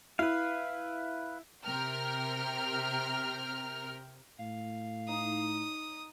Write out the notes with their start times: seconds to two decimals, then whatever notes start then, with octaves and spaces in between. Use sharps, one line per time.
0.19 E4 B4 F5
1.65 C3 A#4 G5 F6
4.39 A2 F5
5.08 D#4 D#6